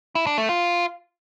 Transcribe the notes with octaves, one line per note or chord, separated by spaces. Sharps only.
E4
D4
A3
F4